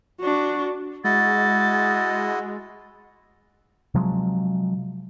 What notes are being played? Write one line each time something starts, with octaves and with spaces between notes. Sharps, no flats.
D4 F#4
G#3 E4 F#4 D#5 A6
C3 F3 F#3 G#3